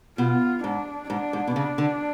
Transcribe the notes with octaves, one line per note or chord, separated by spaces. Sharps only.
B2 F4
G#2 D4
G#2 D4
G#2
B2
C#3 D4
D3